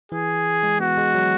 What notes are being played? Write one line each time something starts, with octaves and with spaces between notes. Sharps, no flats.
E3 G#4
G#3
B3 F#4
G#3
F#3